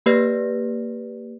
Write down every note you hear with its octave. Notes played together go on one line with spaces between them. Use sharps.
A#3 G4 B4 D5 F6 A#6